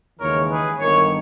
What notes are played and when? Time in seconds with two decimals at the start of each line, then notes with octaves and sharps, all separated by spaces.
0.20 D#2 C#3 E3 G#3 A#4 C#5
0.49 G#4 B4
0.79 G1 G2 D#3 A#4 C#5